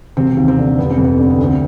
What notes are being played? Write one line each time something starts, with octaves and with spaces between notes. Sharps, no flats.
E1 C3 C4
D#2
C3 C4
D3
F1 B3
C4
F2
B3
D3 C4
B3
D2
C4